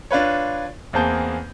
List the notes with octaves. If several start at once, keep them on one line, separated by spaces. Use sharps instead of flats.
D4 F4 B4 C#5
E2 A#3 C4 G#4 A5 G6